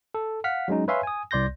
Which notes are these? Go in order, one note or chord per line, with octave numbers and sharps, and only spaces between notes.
A4
F5 F#5 F6 B6
F#3 G#3 C#4 D#4
B4 C#5 E5 F5 G#5 C6
G#5 D#6
C2 D5 C6 G6 A#6